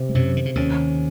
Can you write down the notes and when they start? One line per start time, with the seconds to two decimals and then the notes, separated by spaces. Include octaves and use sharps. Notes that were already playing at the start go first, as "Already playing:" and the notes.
Already playing: C3
0.09 G#3
0.15 F#2 C3 F#3
0.37 D#3
0.45 C#3
0.55 D#2 D#3 C#4